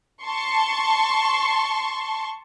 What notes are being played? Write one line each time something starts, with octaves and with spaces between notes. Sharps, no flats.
A5 C6 C#6